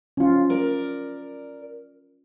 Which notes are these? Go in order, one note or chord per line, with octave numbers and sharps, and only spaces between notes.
C#4 F4
A#4 D5